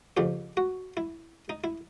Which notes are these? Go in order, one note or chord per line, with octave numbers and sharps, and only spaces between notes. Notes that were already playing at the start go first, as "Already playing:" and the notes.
F2 C#3 F3 G4
F#4
E4
D#4
E4